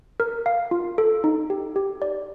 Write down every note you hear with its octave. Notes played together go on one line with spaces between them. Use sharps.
A#4
F5
F4
A4
D#4
G4
G4
D5